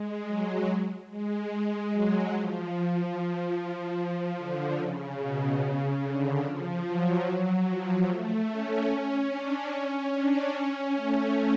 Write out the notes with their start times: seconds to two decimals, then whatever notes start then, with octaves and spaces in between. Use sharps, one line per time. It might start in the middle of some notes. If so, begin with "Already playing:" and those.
Already playing: G#3
0.27 F#3
1.10 G#3
1.50 G#3
1.91 F#3
2.33 F3
2.74 F3
3.96 F3
4.37 D3
4.78 C#3
5.19 B2
5.61 C#3
6.01 D3
6.43 F3
6.84 F#3
7.25 F#3
7.65 F3
8.06 A3
8.48 C#4
8.88 C#4
9.30 D4
9.70 C#4
10.12 D4
10.52 C#4
10.93 A3